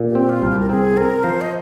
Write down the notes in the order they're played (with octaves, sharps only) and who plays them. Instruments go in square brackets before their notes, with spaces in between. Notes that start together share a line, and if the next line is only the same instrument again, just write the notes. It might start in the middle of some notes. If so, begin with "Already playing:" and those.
Already playing: [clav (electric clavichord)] A#2
[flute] G4
[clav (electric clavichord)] C4
[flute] F4
[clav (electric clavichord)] C2
[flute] G4
A#4
[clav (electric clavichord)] C4 [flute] G#4
[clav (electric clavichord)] C4 [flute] A#4
[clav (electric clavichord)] F3 [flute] C5
[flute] D#5